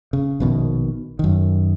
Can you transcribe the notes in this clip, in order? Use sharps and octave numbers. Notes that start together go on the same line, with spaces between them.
C#3
A#1 B2 D#3
F#2 D#3